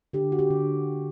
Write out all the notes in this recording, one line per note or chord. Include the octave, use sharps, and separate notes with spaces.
D3 G4
F#4
G4
D3